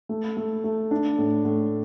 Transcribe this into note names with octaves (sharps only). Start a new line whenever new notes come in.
A3
A3
A3
D4
A2
A2